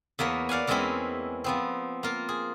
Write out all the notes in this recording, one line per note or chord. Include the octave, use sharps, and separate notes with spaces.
E2 A#3 B3 C#5
D5 F5 F#5 G#5
E2 E3 G#3 C4 C#4 E4
F3 B3 C4
A#3 F4
G#4